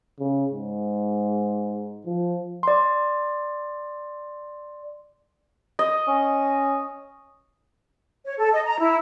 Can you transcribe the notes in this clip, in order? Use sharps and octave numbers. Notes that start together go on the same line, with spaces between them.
C#3
G#2
F3
D5 C6
D#5
C#4
C#5
A4
D#5
A#5
E4